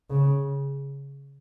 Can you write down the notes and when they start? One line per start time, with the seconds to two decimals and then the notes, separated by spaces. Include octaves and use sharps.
0.10 C#3